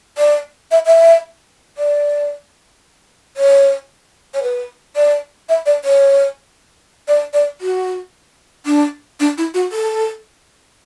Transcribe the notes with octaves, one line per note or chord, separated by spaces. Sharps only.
D5
E5
E5
D5
C#5
C#5
B4
D5
E5
D5
C#5
D5
D5
F#4
D4
D4
E4
F#4
A4